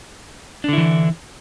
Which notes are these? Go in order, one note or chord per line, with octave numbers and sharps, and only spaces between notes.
D3 E3 D4 E4